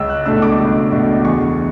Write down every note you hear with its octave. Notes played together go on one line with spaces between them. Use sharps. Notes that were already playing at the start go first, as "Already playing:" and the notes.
Already playing: C#2 E6
F#6
B2 A3 D4 E6
D6
C#2
B2 A3 D4
E2 C#6